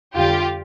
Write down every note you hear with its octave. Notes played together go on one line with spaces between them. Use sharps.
F2 D3 G3 F4 G4